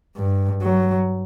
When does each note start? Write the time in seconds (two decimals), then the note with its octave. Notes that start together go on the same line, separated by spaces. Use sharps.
0.17 G2
0.62 F#3